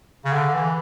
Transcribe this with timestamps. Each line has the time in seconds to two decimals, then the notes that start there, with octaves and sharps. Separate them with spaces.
0.25 C#3
0.33 D3
0.54 E3